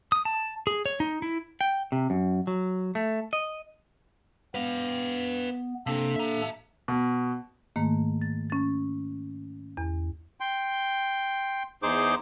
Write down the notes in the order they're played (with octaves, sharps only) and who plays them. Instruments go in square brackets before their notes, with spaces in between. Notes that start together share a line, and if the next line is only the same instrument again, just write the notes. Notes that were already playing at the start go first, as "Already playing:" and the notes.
[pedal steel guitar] D#6
A5
G#4
C#5
D#4
E4
[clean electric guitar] G5
C3
F#2
F#3
A3
D#5
[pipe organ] B3 [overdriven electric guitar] B4 F5
[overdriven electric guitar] C3 [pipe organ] A#3 D4 A4
[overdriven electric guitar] E5 A#5
[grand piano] B2
[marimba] G#2 D#3 A3 A#3
A6
C#4 A6
E2
[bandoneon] G5 C6
E2 D#4 G#4 C5 D6